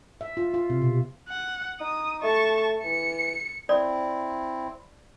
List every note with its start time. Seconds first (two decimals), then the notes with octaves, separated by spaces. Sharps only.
0.21 E5
0.37 F4
0.54 F4
0.70 C3
0.82 B2
1.29 F#5
1.81 D#4 D#6
2.23 A3 A5 C#6
2.84 E3 C#7
3.69 C4 E4 D5